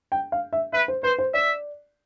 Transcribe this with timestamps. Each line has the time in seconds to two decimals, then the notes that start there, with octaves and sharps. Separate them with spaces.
0.12 G5
0.32 F5
0.53 E5
0.73 B4 E5
0.88 C5
1.03 B4 C5
1.18 C5
1.34 D5 E5